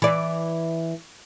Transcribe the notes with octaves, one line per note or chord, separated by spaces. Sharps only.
E3 D5